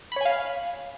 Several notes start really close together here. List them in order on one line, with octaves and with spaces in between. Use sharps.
B5 C#5 G#5 F5